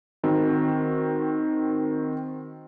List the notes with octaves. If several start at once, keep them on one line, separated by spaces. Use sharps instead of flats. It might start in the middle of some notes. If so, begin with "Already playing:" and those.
D#3 C4 F#4